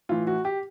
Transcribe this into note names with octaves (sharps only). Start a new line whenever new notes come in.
A2 E3 F4
F#4
G4